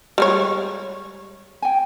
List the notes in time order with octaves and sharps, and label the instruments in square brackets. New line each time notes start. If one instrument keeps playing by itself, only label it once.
[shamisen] G3 G#3 C#5
[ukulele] G5 G#5